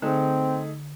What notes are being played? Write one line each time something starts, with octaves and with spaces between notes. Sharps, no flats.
D3 A3 C4 D#4 G#4